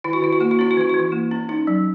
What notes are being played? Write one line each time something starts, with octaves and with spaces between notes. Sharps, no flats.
D#3 E4
F#4
D#3 E4
F#4
A#3 E4
F#4
C#4 E4
F#4
E3 E4
F#4
E3
E4
A#3
C#4
C#4 D#4
F#3